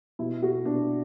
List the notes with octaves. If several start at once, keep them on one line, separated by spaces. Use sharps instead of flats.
B2 E4
F#4
B2 D4